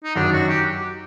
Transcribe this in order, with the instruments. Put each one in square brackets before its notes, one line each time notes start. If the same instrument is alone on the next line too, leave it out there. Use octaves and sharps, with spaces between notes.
[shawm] D#4
[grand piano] F#2 D#3 F#3 [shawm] D4
[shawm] F#4
G4